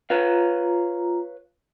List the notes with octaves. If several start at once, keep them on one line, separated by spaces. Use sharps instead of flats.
F4 B4 C#5 F5 A#5